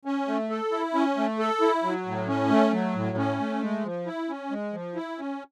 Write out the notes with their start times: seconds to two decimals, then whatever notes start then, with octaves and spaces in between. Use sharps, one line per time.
0.05 C#4
0.27 A3
0.50 A4
0.72 E4
0.94 C#4
1.17 A3
1.39 A4
1.61 E4
1.84 F#3
2.06 A2
2.28 C#4
2.50 A3
2.72 F#3
2.95 A2
3.17 C#4
3.39 A3
3.62 G#3
3.84 F3
4.06 E4
4.29 C#4
4.51 G#3
4.73 F3
4.95 E4
5.18 C#4